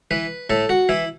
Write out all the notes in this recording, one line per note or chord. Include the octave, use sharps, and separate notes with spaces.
E3 B4
A2 A4
F#4
E3 E4